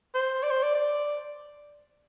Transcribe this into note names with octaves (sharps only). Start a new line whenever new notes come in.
C5
D5
C5
D5
D5